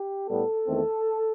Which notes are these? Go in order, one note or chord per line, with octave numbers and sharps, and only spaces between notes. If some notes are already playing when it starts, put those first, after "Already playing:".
Already playing: G4
A2 G3 B3 A4
E2 D#3 A3 C4